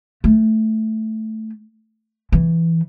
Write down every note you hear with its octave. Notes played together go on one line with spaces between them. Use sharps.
A3
E3